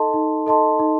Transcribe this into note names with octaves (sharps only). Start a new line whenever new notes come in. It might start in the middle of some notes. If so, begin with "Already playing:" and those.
Already playing: D#4 A4 D#5 A5 C6
D#4
A4 D#5 A5 C6
D#4